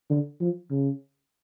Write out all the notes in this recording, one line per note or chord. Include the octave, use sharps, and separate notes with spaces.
D3
F3
C#3